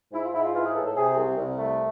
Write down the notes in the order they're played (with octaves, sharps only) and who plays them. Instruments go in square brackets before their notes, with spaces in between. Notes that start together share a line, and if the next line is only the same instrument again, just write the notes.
[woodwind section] G#2 E4
F4
G#2 E4
F4
E3 F4
G#4
A2 A4
A4
C3 G#4
C2
C2
A3